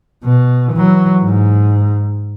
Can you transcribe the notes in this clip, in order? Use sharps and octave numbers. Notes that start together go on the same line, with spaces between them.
B2
E3 F#3
G#2